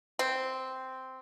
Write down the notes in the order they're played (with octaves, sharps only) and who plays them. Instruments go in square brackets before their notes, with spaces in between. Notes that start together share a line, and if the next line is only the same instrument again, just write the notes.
[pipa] C4